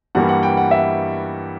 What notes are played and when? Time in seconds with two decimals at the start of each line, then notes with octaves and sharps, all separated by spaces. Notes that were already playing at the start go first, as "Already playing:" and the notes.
0.15 G2 E3 G3 A#3 F#5
0.29 F#5
0.43 G5
0.57 F#5
0.71 E5